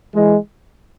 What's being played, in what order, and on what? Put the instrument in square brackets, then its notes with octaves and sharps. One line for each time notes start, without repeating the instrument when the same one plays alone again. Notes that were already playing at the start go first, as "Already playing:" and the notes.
[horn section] E3 G#3